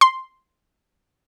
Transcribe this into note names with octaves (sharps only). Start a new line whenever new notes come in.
C6